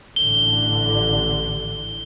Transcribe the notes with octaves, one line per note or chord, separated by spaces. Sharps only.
A1 D3 G7